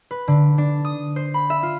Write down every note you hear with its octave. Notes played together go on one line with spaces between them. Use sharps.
B4
D3
D4
D#6
C5
B5
E5
F4